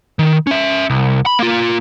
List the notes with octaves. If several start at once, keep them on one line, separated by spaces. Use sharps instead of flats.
D#3
C#4 E5
C2
B5
A#3 F4